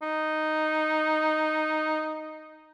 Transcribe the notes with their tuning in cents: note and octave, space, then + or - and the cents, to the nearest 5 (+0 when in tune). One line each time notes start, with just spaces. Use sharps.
D#4 -5